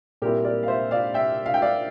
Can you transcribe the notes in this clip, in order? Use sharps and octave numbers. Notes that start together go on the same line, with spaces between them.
A#2 G3 C4 E4 G4 A#4
A#4 D5
F5
C5 E5
D5 F5
E5 G5
F5
G5
D5 F5